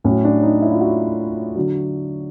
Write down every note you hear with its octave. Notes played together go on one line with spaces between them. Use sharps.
A2 F#3 C#4
D4
D#4
E4
F4
F#4
D3 F#3